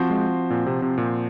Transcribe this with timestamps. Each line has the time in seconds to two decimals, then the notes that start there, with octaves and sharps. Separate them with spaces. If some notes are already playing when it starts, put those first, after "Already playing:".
Already playing: F3 C4 F#4 C5
0.10 G#3
0.50 A#2
0.66 C3
0.82 C3
0.98 A#2